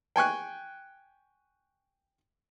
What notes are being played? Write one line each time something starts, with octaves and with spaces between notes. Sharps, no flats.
G5 G#5 C#6 F#6